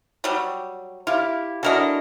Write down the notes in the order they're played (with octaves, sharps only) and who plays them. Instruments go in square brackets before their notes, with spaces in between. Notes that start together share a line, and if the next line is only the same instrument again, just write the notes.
[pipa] F#3 G3
[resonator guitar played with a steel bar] E4 G4 [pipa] F4
[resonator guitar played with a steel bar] D4 E4 F#4 [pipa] A4 A#4 D#5